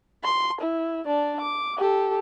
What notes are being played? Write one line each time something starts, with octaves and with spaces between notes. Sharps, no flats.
C6
E4
D4 D5
D6
G4 A4